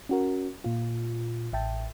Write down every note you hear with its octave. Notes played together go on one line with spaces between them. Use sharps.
C#4 F#4 A#4
A#2 F4
A1 E5 G5 A5